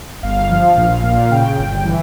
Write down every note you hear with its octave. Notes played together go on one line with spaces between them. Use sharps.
G1 F5
F3
A#1
A#2
C#3 G5
G1
E3